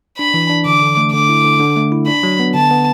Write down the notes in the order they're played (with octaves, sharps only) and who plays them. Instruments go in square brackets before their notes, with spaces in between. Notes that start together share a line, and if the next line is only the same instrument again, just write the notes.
[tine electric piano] D4 [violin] B5
[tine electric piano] E3
D4
[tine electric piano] D3 [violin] D6
[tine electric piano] D3
A3
[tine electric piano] D3 [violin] D6
[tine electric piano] E4
D3
D3
A3
E4
[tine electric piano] D4 [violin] B5
[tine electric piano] F#3
B3
[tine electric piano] D3 [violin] A5
[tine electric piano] B3